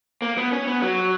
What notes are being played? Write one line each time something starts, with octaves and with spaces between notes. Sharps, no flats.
A#3
B3
C#4
B3
F#3